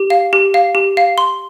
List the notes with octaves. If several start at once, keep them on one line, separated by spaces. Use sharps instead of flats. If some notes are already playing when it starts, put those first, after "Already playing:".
Already playing: G4
F5
G4
F5
G4
F5
C6